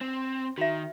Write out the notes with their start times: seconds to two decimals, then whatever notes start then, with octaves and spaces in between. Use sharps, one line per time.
0.01 C4
0.58 D#3 F#4 E5